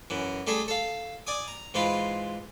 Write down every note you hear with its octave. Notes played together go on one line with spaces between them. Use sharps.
F#2 E3
G3 A3 G#4 A4
A4 F5
D5 G#5 D#6
A#5
G#2 E3 F4 F5 B5